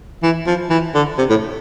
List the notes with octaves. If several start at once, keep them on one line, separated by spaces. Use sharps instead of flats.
E3
F3
E3
D3
C3
A2